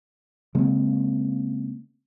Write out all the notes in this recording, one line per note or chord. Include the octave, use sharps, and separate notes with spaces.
C#3 G#3 A#3 C4